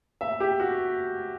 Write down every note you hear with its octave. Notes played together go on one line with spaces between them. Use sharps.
E5
G4
F#4